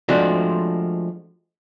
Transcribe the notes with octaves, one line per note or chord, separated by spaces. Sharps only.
F3 G#3 A3 C4 D4 F#4